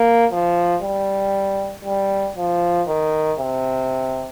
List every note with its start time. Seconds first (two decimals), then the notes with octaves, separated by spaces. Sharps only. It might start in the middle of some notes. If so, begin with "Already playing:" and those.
Already playing: A#3
0.31 F3
0.82 G3
1.85 G3
2.37 F3
2.88 D#3
3.39 C3